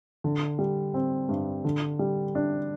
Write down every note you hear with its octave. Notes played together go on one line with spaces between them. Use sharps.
D3
G3
C4
G2
D3
G3
D4